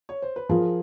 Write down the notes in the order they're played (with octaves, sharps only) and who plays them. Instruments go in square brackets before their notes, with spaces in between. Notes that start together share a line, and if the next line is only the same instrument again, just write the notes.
[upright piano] C#5
C5
B4
[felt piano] F3 [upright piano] G#4 A#4